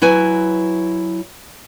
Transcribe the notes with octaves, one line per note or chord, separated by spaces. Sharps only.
F#3 E4 B4 G#5